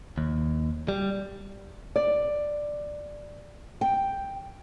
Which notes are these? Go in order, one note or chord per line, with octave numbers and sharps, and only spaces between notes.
D#2
G3
D5
G5